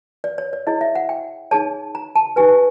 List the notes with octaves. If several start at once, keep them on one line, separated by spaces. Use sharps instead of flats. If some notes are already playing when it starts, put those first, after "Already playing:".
D5
C#5
D5
E4 G#4 C#5 D#5
E5
F#5
G5
D#4 G#4 C#5 A5
A#5
A5
D#4 G4 B4 G#5